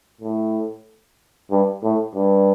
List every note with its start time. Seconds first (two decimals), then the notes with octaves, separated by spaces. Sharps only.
0.21 A2
1.51 G2
1.84 A2
2.15 G2